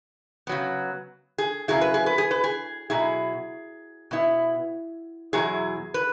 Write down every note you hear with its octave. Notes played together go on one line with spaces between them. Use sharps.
C#3 F#3 B3
G#4
C#3 F#3 E4 G#4
B4
G#4
B4
G#4
B4
G#4
B2 F#3 E4 G#4
B2 B3 E4
E2 B2 F#3 E4 G#4
B4